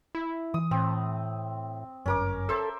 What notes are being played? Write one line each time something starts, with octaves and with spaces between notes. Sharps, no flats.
E4
E3 D#6
A2 C4
G1 F#2 C#4 A#4 D6
A4 C5 E5